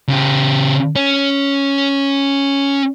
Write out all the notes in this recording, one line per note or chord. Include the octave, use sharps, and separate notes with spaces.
C#3 G4
C#4